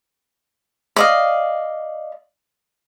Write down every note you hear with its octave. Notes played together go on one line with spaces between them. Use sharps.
D5 D#5 F5